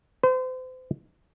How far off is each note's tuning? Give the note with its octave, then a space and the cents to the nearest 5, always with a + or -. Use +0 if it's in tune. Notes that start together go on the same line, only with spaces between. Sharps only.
C5 -35